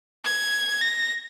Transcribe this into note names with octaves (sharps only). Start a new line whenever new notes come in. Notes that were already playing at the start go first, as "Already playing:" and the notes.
G#6
A#6